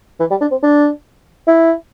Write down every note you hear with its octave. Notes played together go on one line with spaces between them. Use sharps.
E3
G3
D4
C4
D4
E4